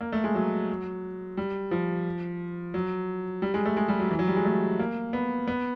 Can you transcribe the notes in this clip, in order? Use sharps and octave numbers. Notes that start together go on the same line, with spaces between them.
A#3
A3
G#3
F#3
G3
F3
F#3
G3
G#3
A3
G#3
G3
F#3
E3
F#3
G3
G#3
A3
A#3
B3
B3